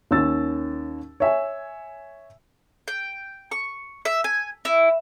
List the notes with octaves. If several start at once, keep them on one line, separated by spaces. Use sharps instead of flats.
D#2 C#4 E6 A6
C#5 E5 G#5
G5
C#6
E5
G#5
E4